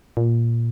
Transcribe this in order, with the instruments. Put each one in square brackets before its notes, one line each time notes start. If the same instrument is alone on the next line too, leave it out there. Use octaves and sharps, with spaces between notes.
[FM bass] A#2